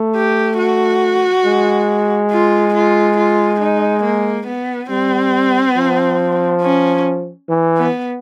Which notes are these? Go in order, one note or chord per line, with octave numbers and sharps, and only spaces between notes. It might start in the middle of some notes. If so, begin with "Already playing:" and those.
Already playing: A3
G4
F#4
G#3
F4
F4
F4
D#4
A#3
B3
G3 C4
F3
C#4
E3
B3